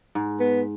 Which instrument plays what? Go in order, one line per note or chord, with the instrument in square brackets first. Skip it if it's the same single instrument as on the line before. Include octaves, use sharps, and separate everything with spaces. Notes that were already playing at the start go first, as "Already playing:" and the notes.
[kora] G#2
[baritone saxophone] B3